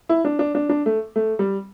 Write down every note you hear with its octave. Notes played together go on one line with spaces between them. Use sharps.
E4
D4
D4
D4
D4
A3
A3
G3